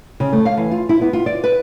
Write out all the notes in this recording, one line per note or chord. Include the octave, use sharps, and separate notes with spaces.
C#3
A3
F5
E3
F4
E4
B3
F4
D5
B4